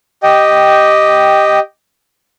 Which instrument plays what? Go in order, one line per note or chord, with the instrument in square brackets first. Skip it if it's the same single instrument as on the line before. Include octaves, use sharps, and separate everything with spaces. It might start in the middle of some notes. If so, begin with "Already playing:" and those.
[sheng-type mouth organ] G4 D#5 G5